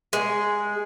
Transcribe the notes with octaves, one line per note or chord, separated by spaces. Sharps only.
G#3